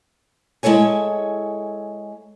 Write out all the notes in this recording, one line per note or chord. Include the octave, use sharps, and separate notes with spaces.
G#3 E4 A4 C#5 G#5